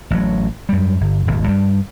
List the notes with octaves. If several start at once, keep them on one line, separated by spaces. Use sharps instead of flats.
A1 F#3
F#2 G3
G1
D#1 G#1 D#2
G2 G3